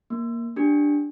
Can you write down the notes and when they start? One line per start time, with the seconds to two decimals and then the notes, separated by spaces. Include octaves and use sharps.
0.10 A#3
0.56 D4 G4